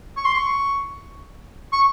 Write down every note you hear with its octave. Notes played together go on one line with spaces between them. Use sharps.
C#6
C6
C#6
C#6